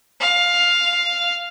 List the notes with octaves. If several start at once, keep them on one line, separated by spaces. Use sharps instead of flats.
F5